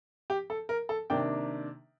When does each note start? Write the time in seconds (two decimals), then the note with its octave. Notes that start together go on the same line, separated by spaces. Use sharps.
0.30 G4
0.50 A4
0.69 A#4
0.89 A4
1.10 C3 D#3 A#3 D4 G5